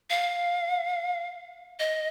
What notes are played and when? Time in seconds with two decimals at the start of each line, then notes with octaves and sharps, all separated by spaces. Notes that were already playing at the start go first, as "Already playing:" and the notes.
0.10 F5
1.79 D#5